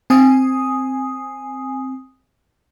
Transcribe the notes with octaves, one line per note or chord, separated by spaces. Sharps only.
C4 G#5 D#6